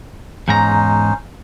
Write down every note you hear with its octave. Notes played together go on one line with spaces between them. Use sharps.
E2 G#2 C#4 D#4 C5 A#5